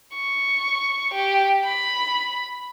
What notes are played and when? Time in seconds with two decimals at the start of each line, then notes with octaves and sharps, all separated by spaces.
0.14 C#6
1.14 G4
1.63 B5